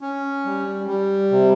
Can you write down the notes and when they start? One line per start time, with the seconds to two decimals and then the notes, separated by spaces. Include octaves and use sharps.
0.01 C#4
0.45 G3
0.87 G3
1.32 C3